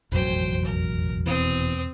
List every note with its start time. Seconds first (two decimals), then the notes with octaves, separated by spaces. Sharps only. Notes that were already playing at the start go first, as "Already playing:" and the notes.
0.12 E1 A1 F2 F#3 C5 G5
0.65 A#4
1.26 F1 B2 E3 C4 D#6